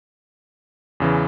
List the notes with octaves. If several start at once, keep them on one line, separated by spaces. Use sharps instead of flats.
E2 C#3 E3